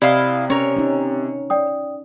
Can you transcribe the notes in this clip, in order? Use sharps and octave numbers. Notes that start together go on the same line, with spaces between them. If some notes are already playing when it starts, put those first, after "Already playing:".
C3 E4 D5 D#5 F5
C#4 A#4 C#5
C#4 D#4
D5 G5 D#6